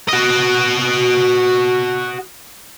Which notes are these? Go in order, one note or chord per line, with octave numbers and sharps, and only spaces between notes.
F#4 D#5